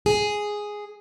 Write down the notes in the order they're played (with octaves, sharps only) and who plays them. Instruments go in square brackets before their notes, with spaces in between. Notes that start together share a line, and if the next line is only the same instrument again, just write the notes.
[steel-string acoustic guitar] G#4